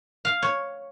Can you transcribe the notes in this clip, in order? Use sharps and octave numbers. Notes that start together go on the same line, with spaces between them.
F5
C#5